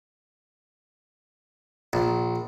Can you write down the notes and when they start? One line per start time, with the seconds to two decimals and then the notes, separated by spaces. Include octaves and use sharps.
1.93 A#1